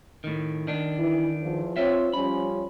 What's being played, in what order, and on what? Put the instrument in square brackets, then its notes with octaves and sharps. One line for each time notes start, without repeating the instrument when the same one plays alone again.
[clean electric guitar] A2 D#3
D#3 D4
[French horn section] E3 E4
E2 F3
[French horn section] C4 C#5 [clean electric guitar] F4 E5
[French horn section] F3 G3 C#4 [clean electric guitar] B5